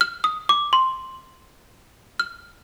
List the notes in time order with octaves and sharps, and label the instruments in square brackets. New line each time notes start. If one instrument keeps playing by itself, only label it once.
[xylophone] F6
D#6
D6
C6
F6